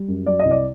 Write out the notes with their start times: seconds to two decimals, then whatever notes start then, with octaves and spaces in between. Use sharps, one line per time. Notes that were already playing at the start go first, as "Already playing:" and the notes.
Already playing: G3
0.08 F#2
0.26 F#3 D5
0.39 D#5
0.45 C2
0.51 D5